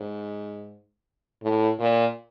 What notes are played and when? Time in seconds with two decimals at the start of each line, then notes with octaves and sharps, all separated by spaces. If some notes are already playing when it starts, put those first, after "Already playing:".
Already playing: G#2
1.43 A2
1.79 A#2